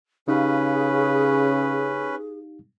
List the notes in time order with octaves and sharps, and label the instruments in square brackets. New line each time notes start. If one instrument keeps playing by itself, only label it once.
[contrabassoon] C#3 [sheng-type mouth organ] C#4 B4 [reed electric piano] D#4 G4 F5 [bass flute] G#4